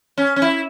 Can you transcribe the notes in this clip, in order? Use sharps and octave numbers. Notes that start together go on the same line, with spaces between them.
C#4
C#4
E4